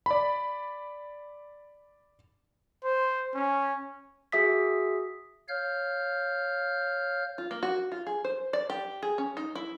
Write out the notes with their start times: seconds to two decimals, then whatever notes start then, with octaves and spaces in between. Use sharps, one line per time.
0.06 D5 B5
2.84 C5
3.34 C#4
4.32 F#4 G#4 E5 D#6 B6
5.48 C#5 F5 F6 G6
7.38 F4
7.51 A#3
7.63 F#4
7.92 F4
8.07 G#4
8.25 C5
8.53 D5
8.70 G4
9.03 G#4
9.18 C#4
9.37 D#4
9.55 E4